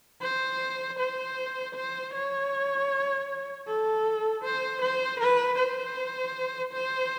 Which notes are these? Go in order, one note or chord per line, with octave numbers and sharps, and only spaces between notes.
C5
C5
C5
C#5
A4
C5
C5
B4
C5
C5